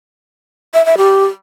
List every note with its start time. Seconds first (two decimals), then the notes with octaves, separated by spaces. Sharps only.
0.74 E5
0.86 E5
0.98 G4